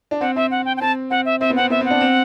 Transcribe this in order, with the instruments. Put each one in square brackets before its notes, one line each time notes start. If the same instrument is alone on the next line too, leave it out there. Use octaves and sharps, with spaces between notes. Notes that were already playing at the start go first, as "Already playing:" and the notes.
[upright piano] D4
[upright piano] C4 [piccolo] F#5
[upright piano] C4 [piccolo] E5
[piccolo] F#5
G5
G5
[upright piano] C4 [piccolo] A5
[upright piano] C4 [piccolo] F#5
[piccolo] E5
[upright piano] C4 [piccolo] E5
[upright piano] B3
[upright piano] C4 [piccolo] F#5
[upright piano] B3 [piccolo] E5
[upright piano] C4 [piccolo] F#5
[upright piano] D4
C4